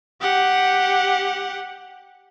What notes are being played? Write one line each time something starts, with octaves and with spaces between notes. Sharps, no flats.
G4 F#5